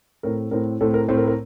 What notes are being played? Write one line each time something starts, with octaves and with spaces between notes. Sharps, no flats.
A2 A3 C4 A#4
A2 A3 C4 A#4
A2 A3 C4 A4
A#4
A2 A3 C4 C5
A#4
A#4